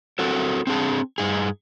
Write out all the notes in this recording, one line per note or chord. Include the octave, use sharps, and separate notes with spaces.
C4 F#4 A4 A#4
C4 D4 G#4 A5
G2 D#4 G#4